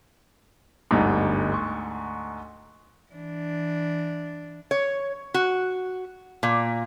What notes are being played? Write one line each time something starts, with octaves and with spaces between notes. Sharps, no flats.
G1 D2 G#2 G3
C6 C#6
E3 D4
C#5
F#4
A#2